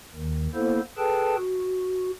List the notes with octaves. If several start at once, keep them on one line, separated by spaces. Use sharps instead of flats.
D#2 D#3
A#3 B3 E4 A4 C5
G#4 A4 B4 G5 A5
F#4